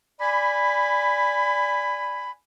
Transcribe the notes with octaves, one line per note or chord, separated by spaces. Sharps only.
D5 G#5 B5